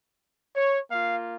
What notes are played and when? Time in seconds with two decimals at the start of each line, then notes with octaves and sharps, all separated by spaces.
0.55 C#5
0.90 A#3 F4 F5